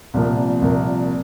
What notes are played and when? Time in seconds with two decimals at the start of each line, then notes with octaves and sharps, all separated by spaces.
0.14 C2 A#2 F3 A#3
0.62 C2 A#2 F3 A#3